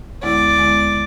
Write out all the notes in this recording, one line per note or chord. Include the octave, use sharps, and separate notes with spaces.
D2 D3 G#3 B3 E4 D5
D2 D3 G#3 B3 E4